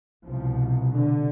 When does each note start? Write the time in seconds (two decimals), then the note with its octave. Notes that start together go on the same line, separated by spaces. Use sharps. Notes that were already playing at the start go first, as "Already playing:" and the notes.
0.24 C2 B2 F3
0.92 D3